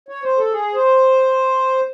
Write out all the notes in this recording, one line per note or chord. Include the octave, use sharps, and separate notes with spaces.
C#5
C5
A4
G#4
C5